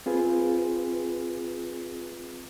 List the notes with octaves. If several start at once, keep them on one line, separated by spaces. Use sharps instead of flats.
C4 F4 G#4 B4